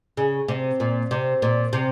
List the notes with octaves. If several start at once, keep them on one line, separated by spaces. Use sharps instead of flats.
C#3
C3
A#2
C3
A#2
C3